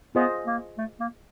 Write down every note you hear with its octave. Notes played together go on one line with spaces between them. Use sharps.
B3 F4 G#4 C5 D#5
A#3
A3
A#3